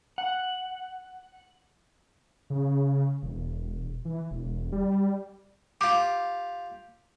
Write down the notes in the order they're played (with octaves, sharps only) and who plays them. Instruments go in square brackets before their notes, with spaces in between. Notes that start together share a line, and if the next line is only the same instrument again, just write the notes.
[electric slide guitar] F#5
[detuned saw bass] C#3
E1
E3
E1
G3
[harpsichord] F4 G4 [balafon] D6